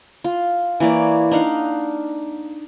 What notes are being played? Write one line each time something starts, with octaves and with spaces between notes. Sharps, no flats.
F4
E3 A#3 C#5 D5
D4 D#4 F5 F#5